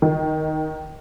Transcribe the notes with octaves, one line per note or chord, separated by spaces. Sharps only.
D#3